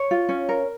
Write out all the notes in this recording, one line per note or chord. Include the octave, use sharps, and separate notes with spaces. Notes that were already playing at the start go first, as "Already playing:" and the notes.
Already playing: C#5
F4
C#4
A#4